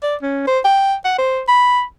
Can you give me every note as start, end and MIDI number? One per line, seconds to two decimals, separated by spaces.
0.03 0.15 74
0.22 0.45 61
0.47 0.59 72
0.65 0.95 79
1.05 1.14 78
1.18 1.41 72
1.48 1.82 83